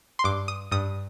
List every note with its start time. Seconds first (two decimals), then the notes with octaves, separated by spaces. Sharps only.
0.19 C6
0.24 G2 D6
0.48 D#6
0.71 G2 D#6